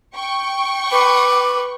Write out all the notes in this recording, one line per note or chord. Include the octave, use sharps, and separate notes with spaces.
G5 C#6
B4 D6